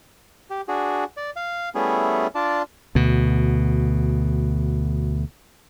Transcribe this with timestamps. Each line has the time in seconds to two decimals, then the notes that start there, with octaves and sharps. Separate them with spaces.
0.50 G4
0.68 D4 F#4 G#4
1.17 D5
1.36 F5
1.75 G3 A3 B3 C#4 E4 G#4
2.35 D4 F4 D5 A5
2.95 D2 B2